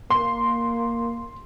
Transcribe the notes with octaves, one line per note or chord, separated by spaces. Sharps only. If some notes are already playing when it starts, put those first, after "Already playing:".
A#3 C6